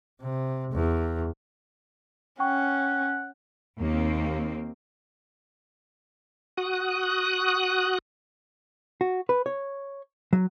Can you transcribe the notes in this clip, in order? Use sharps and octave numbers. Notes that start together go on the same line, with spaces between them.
C3
E2
C#4 F#5 G5 C#6
D#2 A#3 C4
F#4 D#6 F#6
F#4
B4
C#5
F#3